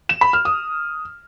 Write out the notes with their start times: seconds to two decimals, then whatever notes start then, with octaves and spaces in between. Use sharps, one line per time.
0.09 E7
0.21 B5
0.33 F6
0.45 D#6